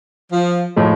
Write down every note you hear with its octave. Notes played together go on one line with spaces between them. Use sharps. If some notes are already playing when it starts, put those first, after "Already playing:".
F3
A2 F3 G#3